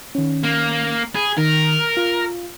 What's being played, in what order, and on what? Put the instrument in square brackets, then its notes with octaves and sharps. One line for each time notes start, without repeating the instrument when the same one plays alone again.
[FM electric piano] D#3 C#4
[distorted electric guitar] A#3
[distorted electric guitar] G#4 [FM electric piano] B5 G#6
[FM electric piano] D#3 [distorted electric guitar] A#4
[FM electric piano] F4